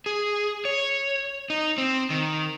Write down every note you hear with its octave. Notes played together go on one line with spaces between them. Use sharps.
G#4
C#5
D#4
C4
D#3